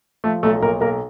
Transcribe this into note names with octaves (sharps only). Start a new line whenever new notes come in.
F3 A3 A4
B1 A3 A4
B1 A#3 A#4
B1 A#3 A#4